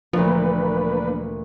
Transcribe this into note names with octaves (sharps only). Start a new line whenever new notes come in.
D2 A#2 E3 F3 A#3 D4 B4